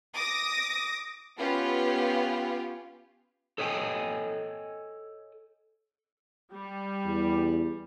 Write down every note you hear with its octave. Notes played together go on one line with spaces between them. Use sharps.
D6 D#6 A#6
B3 C#4 F4 G4 B4
A4 C#5 D#5 E5 G5 G#5
G3
E2